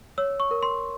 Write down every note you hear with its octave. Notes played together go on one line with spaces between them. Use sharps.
C#5 E6
C#6
A#4
C6